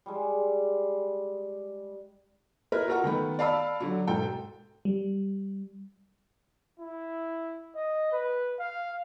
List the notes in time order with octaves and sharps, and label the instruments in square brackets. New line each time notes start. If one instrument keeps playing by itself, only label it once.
[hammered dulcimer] G3 G#3
[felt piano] E4 A#4 B4
F4 F#4 A4 A#4 F#5 A#5
D#3 A3 B3
D5 F5 A5 B5 E6
D3 F#3
E1 G#2 A4 G5
[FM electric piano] G3
[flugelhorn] E4
D#5
B4
F5